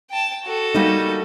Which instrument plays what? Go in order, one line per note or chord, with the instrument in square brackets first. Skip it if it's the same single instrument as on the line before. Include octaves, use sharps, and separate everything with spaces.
[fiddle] G5 A5
F#4 A4
[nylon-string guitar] G3 A#3 D#4